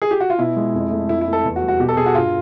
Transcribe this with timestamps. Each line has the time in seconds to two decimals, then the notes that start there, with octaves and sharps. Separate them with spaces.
0.02 G#4
0.11 G4
0.20 F#4
0.30 F4
0.39 B2 E4
0.57 G#3
0.74 F2
0.91 A3
1.09 F2 E4
1.21 E4
1.27 A3
1.33 A4
1.45 E2
1.56 F#4
1.62 G3
1.68 F#4
1.80 B2 G4
1.89 A4
1.97 B2 G#4
2.06 F#4
2.15 G2 F4